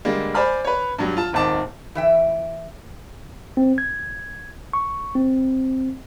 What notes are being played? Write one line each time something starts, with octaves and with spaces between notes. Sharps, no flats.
D3 G3 G#3 A#3
C5 D5 G#5 B5 F6
B4 C#5
G2 F#3 G3
F4 A5
D#1 G#1 D#3 A5 D6
E3 E5 G5
C4
G#6
C#6
C4